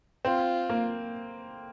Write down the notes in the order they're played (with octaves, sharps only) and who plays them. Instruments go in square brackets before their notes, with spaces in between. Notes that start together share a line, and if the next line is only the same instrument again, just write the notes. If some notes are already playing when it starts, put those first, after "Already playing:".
[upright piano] C4 [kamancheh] F4
[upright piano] A#3